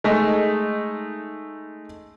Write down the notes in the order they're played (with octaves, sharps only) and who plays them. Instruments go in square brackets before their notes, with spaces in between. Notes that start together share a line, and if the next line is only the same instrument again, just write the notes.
[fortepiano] G#3 A3 D#4